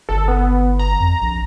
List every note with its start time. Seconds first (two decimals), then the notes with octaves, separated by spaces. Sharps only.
0.09 G1 A4
0.28 B3
0.79 A#5
1.00 F2
1.21 A#1